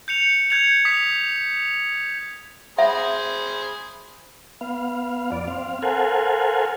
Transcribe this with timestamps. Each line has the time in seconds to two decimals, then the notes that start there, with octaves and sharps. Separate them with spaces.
0.08 G6 C#7 F7
0.50 G6 G#6 C#7 F7
0.85 D#6 B6
2.78 G#4 C5 E5 B5
4.61 B3 F5
5.32 F2 D5
5.47 C4 F5
5.82 A4 A#4 C5 F5 F#5 G#5